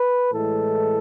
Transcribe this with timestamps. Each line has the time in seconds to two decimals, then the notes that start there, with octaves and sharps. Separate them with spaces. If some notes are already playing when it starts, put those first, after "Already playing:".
Already playing: B4
0.33 A2 E3 G#3 A4